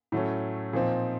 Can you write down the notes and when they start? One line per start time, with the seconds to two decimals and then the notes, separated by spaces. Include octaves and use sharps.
0.12 A2 F#3 A3 C#4
0.73 A#2 F3 C4 D#4